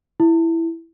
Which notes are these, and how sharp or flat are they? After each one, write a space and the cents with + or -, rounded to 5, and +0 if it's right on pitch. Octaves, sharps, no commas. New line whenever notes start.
E4 +5